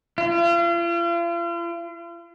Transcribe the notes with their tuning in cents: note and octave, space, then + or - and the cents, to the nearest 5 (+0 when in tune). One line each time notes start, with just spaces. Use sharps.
F4 -40